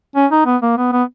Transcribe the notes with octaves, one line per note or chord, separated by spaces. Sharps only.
C#4
D#4
B3
A#3
B3
B3